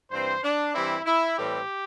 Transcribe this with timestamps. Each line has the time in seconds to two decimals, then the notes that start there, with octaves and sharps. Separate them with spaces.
0.11 G2 E3 C4 C5
0.43 D4
0.74 G2 E3 G3 C4 E4
1.05 E4
1.37 A2 E3 G3 C4 G4